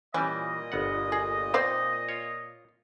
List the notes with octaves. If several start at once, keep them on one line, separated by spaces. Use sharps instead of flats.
A#2 E3 G3 C#4 D#5
G1 B3 F#5
G#4
C4 D#4 C5 D5
F4 C#5